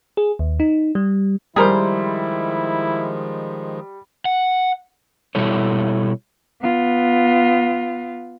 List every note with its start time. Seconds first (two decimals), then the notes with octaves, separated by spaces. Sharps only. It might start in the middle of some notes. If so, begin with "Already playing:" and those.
0.17 G#4
0.39 D#2
0.60 D#4
0.95 G3
1.56 D#3 F3 G3 G#3 E4 G#4 A#4 C5
4.25 F#5
5.35 B2 G3 E4 A4 C#5
6.61 B3 F4